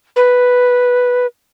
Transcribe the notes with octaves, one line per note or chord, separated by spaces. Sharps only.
B4